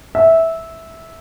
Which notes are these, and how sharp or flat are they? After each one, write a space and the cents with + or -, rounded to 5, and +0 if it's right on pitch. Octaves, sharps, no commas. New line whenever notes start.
E5 -10